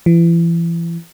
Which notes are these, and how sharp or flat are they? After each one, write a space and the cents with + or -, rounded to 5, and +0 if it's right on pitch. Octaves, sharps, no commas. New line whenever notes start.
E3 +35